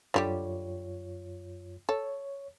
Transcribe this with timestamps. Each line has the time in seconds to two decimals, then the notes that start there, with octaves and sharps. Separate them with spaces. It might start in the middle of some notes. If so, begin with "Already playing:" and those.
0.14 F#2 D3 G3 F4 G4 C#5
1.89 A4 C#5